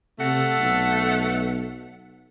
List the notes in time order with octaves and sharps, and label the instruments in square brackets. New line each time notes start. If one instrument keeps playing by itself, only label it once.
[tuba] C3 [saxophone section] A3 A4 F#5
[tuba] B1